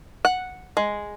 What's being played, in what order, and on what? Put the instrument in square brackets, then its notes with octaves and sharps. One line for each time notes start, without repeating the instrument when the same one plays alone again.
[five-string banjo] F#5
G#3